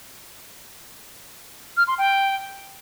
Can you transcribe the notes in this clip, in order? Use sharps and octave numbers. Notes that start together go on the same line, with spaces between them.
F6
C6
G5